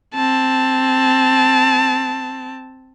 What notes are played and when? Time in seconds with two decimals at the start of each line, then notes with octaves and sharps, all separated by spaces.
0.15 C4 A5